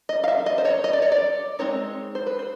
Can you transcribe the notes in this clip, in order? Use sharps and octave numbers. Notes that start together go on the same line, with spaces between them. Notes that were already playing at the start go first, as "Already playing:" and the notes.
D#5
F5
E5
D#5
C5
C#5
D#5
D5
C#5
D5
G#3 C4 D#4 C#5
C5
B4
C5